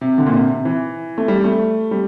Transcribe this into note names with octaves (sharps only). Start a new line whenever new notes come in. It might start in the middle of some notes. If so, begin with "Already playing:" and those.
C3
D3
A#2
C3
C3
E3
A3
G3
A3
G3